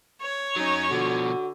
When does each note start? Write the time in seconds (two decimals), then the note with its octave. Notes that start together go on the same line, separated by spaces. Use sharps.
0.22 C#5
0.56 F#3 C#4 D#4
0.91 B2 D3 F3 F#4